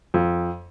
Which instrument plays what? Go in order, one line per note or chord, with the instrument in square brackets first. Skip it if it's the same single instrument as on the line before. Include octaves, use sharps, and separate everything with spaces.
[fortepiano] F2